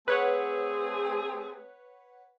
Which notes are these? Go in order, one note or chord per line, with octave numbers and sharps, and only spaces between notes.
A3 C4 G#4 B4 C#5 F#5